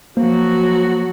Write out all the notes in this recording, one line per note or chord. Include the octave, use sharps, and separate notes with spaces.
F3 F#3 A#3 F#4 C5